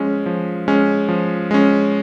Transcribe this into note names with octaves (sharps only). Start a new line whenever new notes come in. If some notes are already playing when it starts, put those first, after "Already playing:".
Already playing: F3 G#3 C#4
F3
G#3 C#4
F3
G#3 C#4